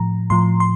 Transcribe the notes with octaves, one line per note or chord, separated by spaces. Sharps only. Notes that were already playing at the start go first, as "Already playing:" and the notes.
Already playing: A2 F3 A#5
A2 F3 C6
C6